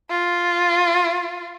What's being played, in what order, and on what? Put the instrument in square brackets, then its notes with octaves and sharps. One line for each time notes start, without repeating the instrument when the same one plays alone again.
[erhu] F4